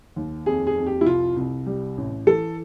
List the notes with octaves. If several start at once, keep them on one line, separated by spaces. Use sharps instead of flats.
D#2
F2 G#4
G#4
F2
G4
E4
C2 F4
C2
G3
A1
E3 A4